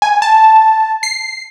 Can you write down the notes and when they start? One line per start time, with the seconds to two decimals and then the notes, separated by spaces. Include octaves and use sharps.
0.02 G#5
0.22 A5
1.03 C7